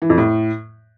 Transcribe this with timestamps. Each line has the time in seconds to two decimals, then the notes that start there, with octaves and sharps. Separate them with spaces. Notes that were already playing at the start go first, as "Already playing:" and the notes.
0.02 E3
0.10 F2
0.18 A2